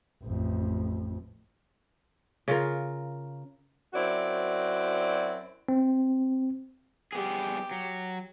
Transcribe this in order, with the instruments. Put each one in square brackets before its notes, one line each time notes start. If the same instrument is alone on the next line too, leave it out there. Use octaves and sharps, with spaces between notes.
[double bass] A1 F2
[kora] C#3 F4 A#4
[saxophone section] F#2 C4 E4 F#4 D5
[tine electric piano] C4
[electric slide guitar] G3 B3 G#4 [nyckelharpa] G4
[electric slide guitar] F#3